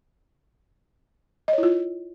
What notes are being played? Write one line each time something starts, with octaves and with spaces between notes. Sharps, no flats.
D#5
C#5
E4
F4